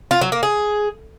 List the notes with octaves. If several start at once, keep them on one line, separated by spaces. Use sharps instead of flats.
F4
F#3
A#3
G#4